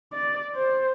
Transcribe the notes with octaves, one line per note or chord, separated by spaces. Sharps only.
D5
C5